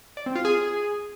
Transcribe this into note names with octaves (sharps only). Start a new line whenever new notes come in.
D5
C4
F4
G#4